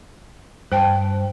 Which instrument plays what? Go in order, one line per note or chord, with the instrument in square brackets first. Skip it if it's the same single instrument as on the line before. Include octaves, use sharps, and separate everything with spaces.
[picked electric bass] G2 [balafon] C5 G5 A5